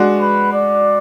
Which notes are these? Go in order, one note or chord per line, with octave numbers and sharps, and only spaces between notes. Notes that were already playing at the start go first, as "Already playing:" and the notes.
Already playing: G#3 D4 F#4
B4
D5